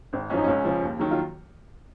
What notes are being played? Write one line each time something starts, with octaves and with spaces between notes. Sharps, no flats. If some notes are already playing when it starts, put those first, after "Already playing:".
G#1 C4
F#2 F3 C#4
D#4
C#2 C#4
C#3 F3
D#2
D#3 F#3
F4